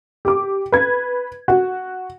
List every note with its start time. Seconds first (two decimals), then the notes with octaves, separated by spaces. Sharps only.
0.25 G4 D6
0.72 B4 G#6
1.48 F#4